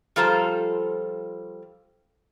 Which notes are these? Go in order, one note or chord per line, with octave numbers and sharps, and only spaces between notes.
F3 G3 F4 A4 C5 A#5